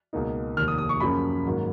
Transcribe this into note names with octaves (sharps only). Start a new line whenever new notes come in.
C#2 B2 A#3 D#4
F1 D#2 D#3 F6
D#6
D#6
C#6
F#2 C#3 F3 A#3 C#4 B5
G#2 D#3 F#3 A#3